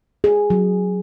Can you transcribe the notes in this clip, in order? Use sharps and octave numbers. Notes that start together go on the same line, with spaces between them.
G#4
F#3